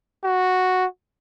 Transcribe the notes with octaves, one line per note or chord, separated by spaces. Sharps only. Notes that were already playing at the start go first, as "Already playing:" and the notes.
F#4